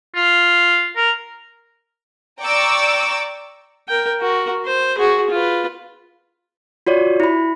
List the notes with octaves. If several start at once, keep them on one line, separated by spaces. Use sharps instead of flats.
F4
A#4
D5 G5 A#5 C#6 D6 E6
A#4 G5
F#4 A#4
C5
F#4 G#4
F4 B4
F4 F#4 C#5 D5
E4 B5